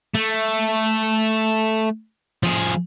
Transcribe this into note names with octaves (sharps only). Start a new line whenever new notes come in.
A3
F3 G#4